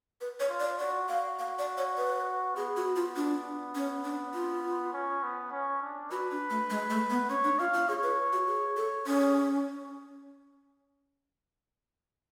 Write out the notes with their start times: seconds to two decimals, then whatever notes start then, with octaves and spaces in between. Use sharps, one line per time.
0.21 B4
0.40 C#5
0.49 F4
0.60 D5
0.79 F#4 D5
1.09 F#4 F5
1.39 F5
1.59 D5
1.78 C#5
1.98 B4
2.56 B3 G#4
2.77 F#4
2.96 F4
3.16 D4
3.75 C#4
4.04 D4
4.34 F4
4.92 C#4
5.23 B3
5.51 C#4
5.82 D4
6.11 F#4 B4
6.31 D4
6.50 A3
6.70 G#3
6.90 A3
7.10 B3
7.30 C#4 C#5
7.44 D4
7.59 F4 F5
7.73 F4
7.89 G#4 C#5
8.03 B4
8.33 F#4
8.47 G#4
8.77 A4
9.06 C#4 G#4